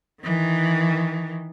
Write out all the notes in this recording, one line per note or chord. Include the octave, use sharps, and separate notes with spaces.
D#3 E3